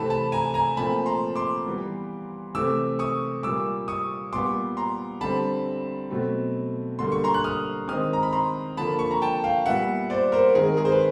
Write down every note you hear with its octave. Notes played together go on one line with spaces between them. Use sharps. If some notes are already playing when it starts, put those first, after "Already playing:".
Already playing: C3 E3 A3 C4 A5 B5
A5 B5
G#5 A#5
G#5 A#5
A#2 F3 A3 C4 A5 B5
A#5 C6
C6 D6
E3 G3 B3
C3 E3 A3 C4 D6 E6
C#6 D#6
A#2 G3 A#3 D6 E6
C#6 D#6
A#2 G3 B3 C6 D6
A#5 C6
D3 G3 C4 A5 B5
B2 F#3 A3 C4
D3 G3 A#3 C6
C#6
A#5 C6
F#6
D#6 F6
D#3 G#3 C4 D#6 F6
A#5
B5
A#5 C6
D3 F3 A#3 A5 B5
B5 C#6
A#5
G5 A5
F5 G5
A#2 G3 B3 E5 F#5
C5 D5
A#4 C5
D#3 G#3 C4 G#4 A#4
G#4 A#4
C5
B4